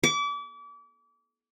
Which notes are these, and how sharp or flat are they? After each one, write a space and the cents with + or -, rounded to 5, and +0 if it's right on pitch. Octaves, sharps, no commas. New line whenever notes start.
D6 -35